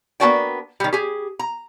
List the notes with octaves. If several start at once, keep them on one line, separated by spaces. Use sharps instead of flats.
A#3 B3 D4 F#4 D5 G5
D#3 G3
G4 G#4
A#5